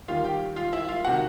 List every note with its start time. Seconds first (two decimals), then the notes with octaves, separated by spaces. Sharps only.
0.08 D#2 D#3 G3 F4 F5
0.24 G4 G5
0.56 F4 F5
0.73 E4 E5
0.88 F4 F5
1.04 C3 D#3 F#4 F#5